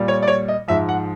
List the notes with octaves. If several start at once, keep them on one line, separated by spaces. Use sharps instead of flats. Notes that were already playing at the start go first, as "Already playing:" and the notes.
Already playing: A#2 G3
C#5
D5
C#5
D#5
G#2 F3 E5
F#5